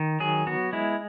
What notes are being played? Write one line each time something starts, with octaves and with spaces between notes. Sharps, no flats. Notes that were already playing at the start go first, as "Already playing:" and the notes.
Already playing: D#3
F#3 G#4
B3 F#4
G#3 E4